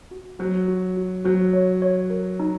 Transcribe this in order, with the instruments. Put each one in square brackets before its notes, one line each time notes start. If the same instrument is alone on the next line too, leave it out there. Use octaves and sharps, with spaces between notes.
[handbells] F#4
[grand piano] F#3 [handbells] F#4
[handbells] F#4
F#4
[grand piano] F#3 [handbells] F#4
[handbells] C#5
C#5
A#4
D#4